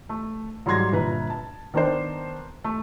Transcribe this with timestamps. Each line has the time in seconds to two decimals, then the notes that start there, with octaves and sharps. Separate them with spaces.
0.09 A3
0.66 G#2 F#3 G3 C6 G#6 A#6
0.93 G1 A#2 B4 A#5
1.30 A5
1.74 D#3 B3 D4 A#4 C5
2.64 A3